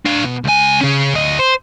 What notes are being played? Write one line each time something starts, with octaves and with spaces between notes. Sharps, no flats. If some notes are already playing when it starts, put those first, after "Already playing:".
D4 F5
B2
C#2 G#5
C#3 C#4
D2 D#5
C5